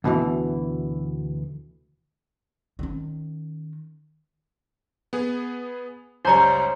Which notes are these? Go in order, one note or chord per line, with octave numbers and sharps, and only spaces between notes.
D2 B2 D3 E3
D#3 C#4
B3 G#4
C#2 F#2 G3 D#4 C5 C#5 A#5